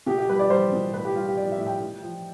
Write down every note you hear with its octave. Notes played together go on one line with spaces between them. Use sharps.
B2 G4
G4
G3 B4
D5
G3 C5
B2
A2 B4
G4
G3 F4
G4
G3 D5
E5
A2
G5
A2
F3